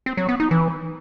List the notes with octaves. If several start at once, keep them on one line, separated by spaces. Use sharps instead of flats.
C4
F#3
B3
D#4
E3